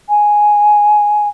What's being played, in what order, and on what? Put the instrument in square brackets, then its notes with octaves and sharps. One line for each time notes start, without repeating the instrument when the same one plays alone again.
[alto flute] G#5